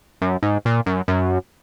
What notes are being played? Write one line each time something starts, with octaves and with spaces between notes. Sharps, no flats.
F#2
G#2
A#2
F#2
F#2